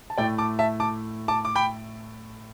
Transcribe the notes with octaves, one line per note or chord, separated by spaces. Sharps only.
A5
A2 A3 D5 G5
A5 D6
E5 A5
A5 D6
A5 D6
D6
G5 B5